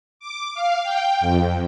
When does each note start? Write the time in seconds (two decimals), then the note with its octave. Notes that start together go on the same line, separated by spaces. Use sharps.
0.20 D6
0.54 F5
0.83 G5
1.20 F2